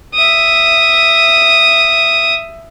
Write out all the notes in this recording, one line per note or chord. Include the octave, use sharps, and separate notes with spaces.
E5 D#6